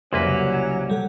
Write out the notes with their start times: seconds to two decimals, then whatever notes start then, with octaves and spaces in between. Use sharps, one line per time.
0.13 C2 F2 F#3 A#3 C#4 B4 C6
0.25 C#3
0.90 G3 A4 F#5